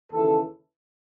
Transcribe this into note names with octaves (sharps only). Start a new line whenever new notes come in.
D#2 C#3 E3 A4